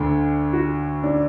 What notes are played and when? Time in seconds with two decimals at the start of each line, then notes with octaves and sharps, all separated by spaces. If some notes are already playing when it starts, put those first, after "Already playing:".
Already playing: D2 D3
0.53 F#4
1.04 D4